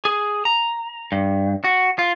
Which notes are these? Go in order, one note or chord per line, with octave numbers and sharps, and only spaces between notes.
G#4
A#5
G2
F#4
F4